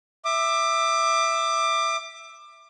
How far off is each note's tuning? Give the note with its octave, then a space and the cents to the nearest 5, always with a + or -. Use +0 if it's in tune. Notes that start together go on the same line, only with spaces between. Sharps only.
E5 +0 D6 +25